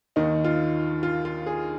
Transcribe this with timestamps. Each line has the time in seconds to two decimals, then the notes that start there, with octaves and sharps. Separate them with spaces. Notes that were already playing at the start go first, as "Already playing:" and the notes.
0.16 D#2 D#3 D#4
0.44 F4
1.03 F4
1.25 F4
1.46 G#4